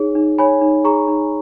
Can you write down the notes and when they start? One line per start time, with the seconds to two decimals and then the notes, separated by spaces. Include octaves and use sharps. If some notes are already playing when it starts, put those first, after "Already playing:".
Already playing: D#4 G#4 C#5
0.15 D#4
0.38 C#5 G#5 B5
0.61 D#4
0.84 G#4 A#5 C#6
1.08 D#4